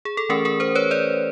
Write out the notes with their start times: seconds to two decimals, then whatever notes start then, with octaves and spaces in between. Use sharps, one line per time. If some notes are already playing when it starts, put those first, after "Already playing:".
0.05 G#4
0.17 A4
0.29 E3 A3 C#4 G#4 A#4
0.45 G#4 A#4
0.60 A#4 C5
0.75 B4 C#5
0.91 C5 D5